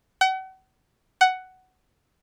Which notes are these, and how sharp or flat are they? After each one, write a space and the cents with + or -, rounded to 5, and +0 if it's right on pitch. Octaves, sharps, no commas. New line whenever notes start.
F#5 +40
F#5 +10